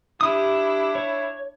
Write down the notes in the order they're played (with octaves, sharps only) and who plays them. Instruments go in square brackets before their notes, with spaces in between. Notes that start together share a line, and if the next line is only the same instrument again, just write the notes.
[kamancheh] D4 E4 [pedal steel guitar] G4 D#6
[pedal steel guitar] C#5